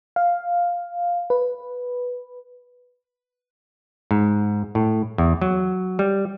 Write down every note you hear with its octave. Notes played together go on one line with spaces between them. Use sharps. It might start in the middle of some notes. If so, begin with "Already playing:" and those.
F5
B4
G#2
A2
E2
F#3
G3